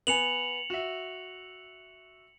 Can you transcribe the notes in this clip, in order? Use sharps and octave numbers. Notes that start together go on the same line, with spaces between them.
B3 G#5 C#7 F7 F#7
F#4 E5